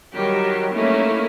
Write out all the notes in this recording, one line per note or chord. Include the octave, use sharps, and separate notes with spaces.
D#3 F#3 G3 G4
A3 A#3 C#4 D#4 E4